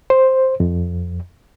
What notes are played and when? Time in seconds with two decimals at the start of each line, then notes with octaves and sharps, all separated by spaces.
0.10 C5
0.60 F2